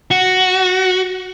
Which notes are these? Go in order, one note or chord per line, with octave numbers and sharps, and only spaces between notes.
F#4